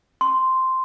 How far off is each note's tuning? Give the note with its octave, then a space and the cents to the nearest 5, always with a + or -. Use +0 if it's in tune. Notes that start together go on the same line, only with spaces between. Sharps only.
C6 -5